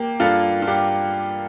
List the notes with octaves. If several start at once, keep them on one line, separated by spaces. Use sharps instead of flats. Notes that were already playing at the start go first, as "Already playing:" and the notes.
Already playing: A#3 G4
G2 F4 A4
F4
G2 G4